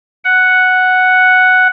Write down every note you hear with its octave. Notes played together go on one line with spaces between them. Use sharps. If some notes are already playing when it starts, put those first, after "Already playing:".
F#5